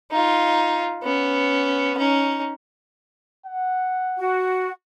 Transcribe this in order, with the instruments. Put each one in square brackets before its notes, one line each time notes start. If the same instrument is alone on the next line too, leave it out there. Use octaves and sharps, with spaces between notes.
[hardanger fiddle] D#4 F4
B3 C#4
C#4 D#4
[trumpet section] F#5
[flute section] F#4